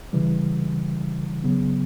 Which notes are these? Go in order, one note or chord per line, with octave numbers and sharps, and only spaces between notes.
C#3 E3 G3
C#3 F#3 B3